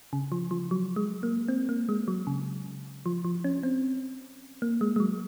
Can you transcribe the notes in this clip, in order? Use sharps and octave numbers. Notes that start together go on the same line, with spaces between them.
C#3
F3
F3
F#3
G#3
A#3
C4
A#3
G#3
F#3
C#3
F3
F3
C#4
C4
A#3
G#3
G#3
F#3